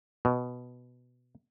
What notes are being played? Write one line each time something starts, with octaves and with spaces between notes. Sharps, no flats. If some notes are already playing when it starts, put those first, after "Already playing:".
B2